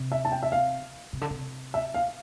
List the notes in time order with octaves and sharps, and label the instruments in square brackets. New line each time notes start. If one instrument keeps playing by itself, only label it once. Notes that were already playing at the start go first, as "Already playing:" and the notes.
Already playing: [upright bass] C3
[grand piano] E5
A5
G5
E5
F5
[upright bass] C3
D3
C3
[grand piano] E5
F5